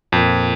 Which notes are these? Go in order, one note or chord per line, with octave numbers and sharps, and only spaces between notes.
F2 A#2 A#3 F4 A#4